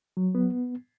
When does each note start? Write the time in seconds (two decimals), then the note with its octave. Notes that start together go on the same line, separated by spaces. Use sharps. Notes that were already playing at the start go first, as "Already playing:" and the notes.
0.17 F#3
0.35 B3